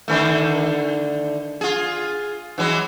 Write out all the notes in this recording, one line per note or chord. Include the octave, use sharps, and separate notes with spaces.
D3 D#3 A3
F4 G#4
E3 F#3 G#3